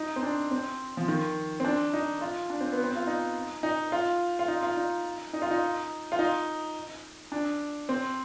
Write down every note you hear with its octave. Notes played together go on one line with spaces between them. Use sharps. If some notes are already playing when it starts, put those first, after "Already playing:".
Already playing: D#4
C4
D4
C4
F3
D#3
C4
D4
D#4
F4
D4
C4
B3
C4
F4
D#4
D#4
F4
F4
D#4
F4
D#4
D#4
F4
D#4
F4
D#4
D4
C4